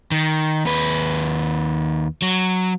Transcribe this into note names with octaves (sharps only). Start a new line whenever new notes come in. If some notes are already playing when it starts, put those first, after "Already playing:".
D#3
D#2 B4
F#3